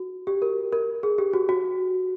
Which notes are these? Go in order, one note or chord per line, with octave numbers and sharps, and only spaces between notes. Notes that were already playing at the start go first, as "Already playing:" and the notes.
Already playing: F#4
G4
A#4
A#4
G#4
G4
F#4
F#4